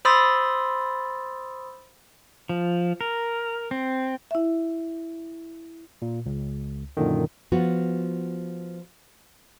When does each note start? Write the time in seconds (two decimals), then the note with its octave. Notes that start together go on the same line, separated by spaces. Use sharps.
0.05 C5 B5 C6 D#6 E6 A6
2.49 F3
3.01 A#4
3.71 C4
4.31 E4 E5
6.02 A#2
6.26 C#2
6.97 F#2 A#2 D3 D#3
7.52 F3 B3 F4 F#4